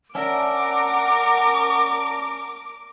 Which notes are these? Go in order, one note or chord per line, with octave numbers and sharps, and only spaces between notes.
C#4 D4 A#4 E5 F#5 D6